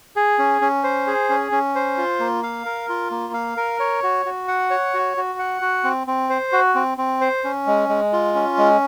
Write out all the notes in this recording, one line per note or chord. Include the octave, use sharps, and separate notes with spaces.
G#4
C#4
C#4
C5
G#4
C#4
C#4
C5
F4
A#3
F5
A#4
F4
A#3
F5
A#4
C#5
F#4
F#4
F#5
C#5
F#4
F#4
F#5
F#4
C4
C4
C5
F#4
C4
C4
C5
C#4
G#3
G#3
F4
C#4
G#3